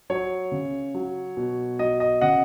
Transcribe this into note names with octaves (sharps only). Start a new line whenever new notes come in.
F#3 C#5
C#3
F#3
B2
F#3 D#5
D#5
C#3 D#5 F#5